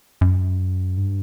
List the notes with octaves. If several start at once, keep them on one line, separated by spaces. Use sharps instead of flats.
F#2
G2